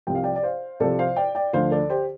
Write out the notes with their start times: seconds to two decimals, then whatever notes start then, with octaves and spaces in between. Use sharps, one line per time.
0.07 C2 C3 F3 G5
0.15 F5
0.24 D5 G5
0.36 D5
0.43 C5 F5
0.80 C2 C3 F3 A4 D5
0.99 C5 F5
1.16 D5 G5
1.35 D5 G5
1.53 D2 D3 F3 C5 F5
1.71 A4 D5
1.90 G4 C5